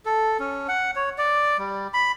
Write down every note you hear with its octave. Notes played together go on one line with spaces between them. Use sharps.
A4
C#4
F#5
C#5
D5
G3
B5